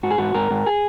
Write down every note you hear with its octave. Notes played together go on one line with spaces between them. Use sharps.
G#2 F#4
G#4
G#2 F#4
G#2 A#4
G#2
G#4